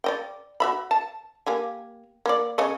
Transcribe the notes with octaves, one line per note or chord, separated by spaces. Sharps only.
D5 D#5 G5
F#4 E5 B5
A5
A#3 G4 G#5
A#3 D5
C#3 C#5 D#5